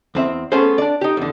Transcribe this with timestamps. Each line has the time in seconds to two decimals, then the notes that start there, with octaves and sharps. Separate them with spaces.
0.15 E2 C4 E5
0.52 A3 B3 C#4 G#4 C5
0.78 D4 D5
1.01 D#4 G4
1.17 E2 D3